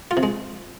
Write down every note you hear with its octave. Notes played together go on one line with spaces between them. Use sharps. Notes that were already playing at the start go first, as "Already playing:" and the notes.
F4
C3
G#3